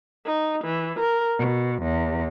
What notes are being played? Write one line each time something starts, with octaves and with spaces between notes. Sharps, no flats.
D#4
E3
A#4
B2
E2